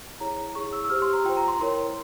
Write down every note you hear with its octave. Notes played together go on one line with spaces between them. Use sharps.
E4 G#4 C#5 A#5
E4 G#4 C#5 C#6
E6
E6
G4 C5 F6
C6
A#5
F4 C5 G5
A#5
C6
E4 A#4 C#5 C6